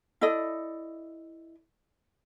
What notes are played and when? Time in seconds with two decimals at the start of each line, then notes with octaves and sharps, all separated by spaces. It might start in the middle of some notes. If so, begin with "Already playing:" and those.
0.21 E4 A4 D5 D#5